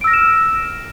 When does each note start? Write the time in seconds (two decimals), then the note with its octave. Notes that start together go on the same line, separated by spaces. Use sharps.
0.01 D7
0.04 E6
0.07 A#6
0.10 F6
0.13 E7